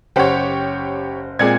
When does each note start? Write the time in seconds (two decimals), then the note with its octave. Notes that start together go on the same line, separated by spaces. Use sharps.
0.16 F#1 G4 C5 C#5 F#5
1.39 A#2 G#3 C4 G#4 D5 G#6